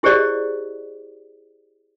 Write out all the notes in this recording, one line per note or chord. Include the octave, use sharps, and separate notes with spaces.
E4 G4 G#4 C5 D5 D#5